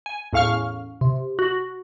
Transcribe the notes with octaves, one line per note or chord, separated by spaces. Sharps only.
G#5
E2 A2 C#4 F5 C#6 F6
C3
F#4